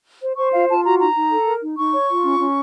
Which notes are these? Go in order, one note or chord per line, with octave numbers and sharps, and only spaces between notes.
C5
C5 C#6
F4 F5
F4 A5
F#4 A#5
D#4 A#5
D#4
A4
A#4
D#4
D#4 C#6
C#5
F4
C#4
C#4